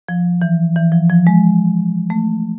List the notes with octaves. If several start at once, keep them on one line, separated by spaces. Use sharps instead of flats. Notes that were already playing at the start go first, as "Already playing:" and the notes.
F3
E3
E3
F3
F3
G#3
A3